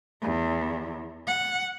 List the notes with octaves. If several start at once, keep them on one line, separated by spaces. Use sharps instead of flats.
E2
F#5